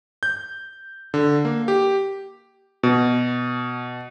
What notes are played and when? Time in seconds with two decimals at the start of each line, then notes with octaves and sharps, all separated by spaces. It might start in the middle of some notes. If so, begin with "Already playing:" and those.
0.23 G6
1.14 D3
1.45 A#3
1.68 G4
2.83 B2